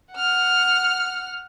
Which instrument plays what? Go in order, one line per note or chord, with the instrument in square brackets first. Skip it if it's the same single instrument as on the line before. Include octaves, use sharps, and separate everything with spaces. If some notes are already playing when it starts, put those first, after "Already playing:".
[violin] F#5 F6